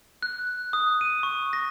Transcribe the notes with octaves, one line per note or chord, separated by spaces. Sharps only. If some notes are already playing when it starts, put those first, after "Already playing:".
F#6
D#6
D#7
C#6
A#6